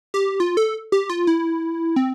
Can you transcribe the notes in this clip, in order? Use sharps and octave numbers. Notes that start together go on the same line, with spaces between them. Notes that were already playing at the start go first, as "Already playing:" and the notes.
G4
F4
A4
G4
F4
E4
C4